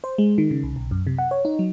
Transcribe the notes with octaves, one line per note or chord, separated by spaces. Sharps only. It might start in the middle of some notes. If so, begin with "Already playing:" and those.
C5
G#3
D#3
C#3
C2
B1
F#2
C3
F#5
C#5
D#4
F#3